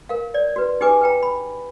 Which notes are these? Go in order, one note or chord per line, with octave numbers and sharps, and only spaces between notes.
A#4 F5
C#5 D5
F#4 B4
D#4 G4 G#4 B4 G#5 D6
B4 G5 A#5
B5